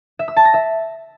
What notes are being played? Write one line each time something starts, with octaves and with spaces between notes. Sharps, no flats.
E5
E6
A5
A#6
E5